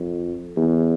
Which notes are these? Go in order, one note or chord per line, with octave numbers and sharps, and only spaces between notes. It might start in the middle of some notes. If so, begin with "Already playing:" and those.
Already playing: F2
E2